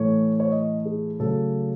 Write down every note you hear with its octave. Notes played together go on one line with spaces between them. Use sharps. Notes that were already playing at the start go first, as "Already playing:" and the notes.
Already playing: A2 E3 A3 C#5
C#5
D#5
G#4
C#3 F#3 A3 A4